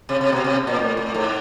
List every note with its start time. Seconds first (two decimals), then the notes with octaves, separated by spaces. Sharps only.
0.09 C3
0.21 C3
0.32 B2
0.44 C3
0.67 A#2
0.79 A2
0.97 A2
1.14 G#2